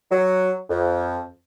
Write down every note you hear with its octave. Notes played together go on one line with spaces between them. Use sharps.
F#3
F2